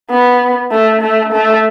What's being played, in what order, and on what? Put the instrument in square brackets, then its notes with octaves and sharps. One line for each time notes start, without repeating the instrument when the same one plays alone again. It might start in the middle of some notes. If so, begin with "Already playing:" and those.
[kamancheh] B3
A3
A3
A3